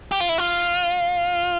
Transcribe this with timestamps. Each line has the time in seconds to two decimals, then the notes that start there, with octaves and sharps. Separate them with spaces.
0.12 G4
0.20 F4
0.29 E4
0.38 F4